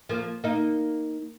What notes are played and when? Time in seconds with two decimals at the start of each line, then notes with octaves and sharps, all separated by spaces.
0.09 F3 A#3
0.44 A#3 D#4